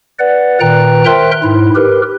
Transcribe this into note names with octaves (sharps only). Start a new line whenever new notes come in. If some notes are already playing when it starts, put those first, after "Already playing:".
B4 D5 F#5
A#2 D#3 B4 G5 A#5 F#6
A#4 C5 E5 G5 C6 F#6
G#2 E4
G4 A#4 B4